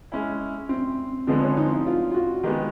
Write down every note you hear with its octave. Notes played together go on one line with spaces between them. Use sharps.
G#3 C#4 E4
C4
D3 F3 G#3 B3 C4
C#4
D#4
E4
F4
F4
F#4
D#3 G#3 B3 G4